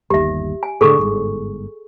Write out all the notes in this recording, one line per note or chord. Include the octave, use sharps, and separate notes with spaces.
G1 D#2 G4 E5
G#5
A2 D3 G#4 A4 C#6
G1 G#2